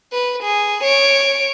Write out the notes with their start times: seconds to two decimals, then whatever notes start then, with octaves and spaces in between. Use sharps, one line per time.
0.12 B4
0.43 G#4
0.83 C#5 D7